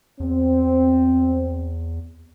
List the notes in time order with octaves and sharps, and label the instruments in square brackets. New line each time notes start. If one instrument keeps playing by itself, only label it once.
[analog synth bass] E2 [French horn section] C4